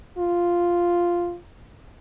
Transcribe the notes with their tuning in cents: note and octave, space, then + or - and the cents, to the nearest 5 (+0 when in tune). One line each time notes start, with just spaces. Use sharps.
F4 +0